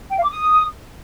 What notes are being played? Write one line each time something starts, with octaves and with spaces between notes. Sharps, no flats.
G5
F5
D6
D#6